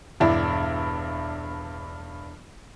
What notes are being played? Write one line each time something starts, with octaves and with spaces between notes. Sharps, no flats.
E1 G2 D4 E4